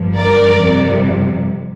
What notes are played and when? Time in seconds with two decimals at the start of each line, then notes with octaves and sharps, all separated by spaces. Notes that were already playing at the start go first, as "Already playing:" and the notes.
Already playing: G1 G2 F3
0.16 A#4 D5
0.56 G1 F2 C3 G3